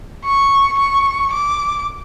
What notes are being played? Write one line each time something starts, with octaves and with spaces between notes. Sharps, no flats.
C#6
C#6
D6